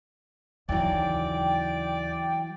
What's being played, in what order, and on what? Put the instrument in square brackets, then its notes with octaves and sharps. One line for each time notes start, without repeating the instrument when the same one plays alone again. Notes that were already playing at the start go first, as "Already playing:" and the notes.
[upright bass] D#2 C#3 [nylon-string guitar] E3 F#3 [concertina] D5 [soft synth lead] G5